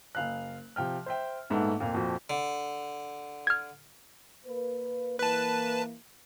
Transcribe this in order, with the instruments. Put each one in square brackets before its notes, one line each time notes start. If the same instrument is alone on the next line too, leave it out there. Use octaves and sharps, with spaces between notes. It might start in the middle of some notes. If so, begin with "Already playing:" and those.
[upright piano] F#1 F5 F#6
C3 F3 G5 F6
C5 E5 G5
A#1 G#2 A3 B3 A4 F#5
F2 A#2 A#4 F5
F2 A#2 F3 F#4
[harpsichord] D3
[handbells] F6 G#6
[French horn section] A#3 B4
[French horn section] E3 A#3 [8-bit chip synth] B4 A5